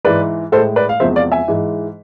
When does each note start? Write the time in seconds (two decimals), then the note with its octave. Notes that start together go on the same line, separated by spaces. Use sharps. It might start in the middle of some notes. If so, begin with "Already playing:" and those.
0.05 G#2 E3 G#3 B4 D5
0.52 A2 A4 C5
0.57 G#3
0.76 B4 D5
0.89 F5
1.00 E2 C3 F3 G#3 C5 E5
1.16 D5 F5
1.32 E5 G#5
1.48 G#2 E3 G#3